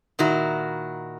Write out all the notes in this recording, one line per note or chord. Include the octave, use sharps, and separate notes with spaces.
A#2 D#3 E4 F#4